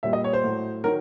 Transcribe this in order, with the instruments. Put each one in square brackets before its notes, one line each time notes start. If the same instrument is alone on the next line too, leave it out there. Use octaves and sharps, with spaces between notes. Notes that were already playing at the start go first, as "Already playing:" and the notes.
[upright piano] A#2 G3 E5
D#5
C#5
C5
A2 F#3 A3
D#3 F#3 A#4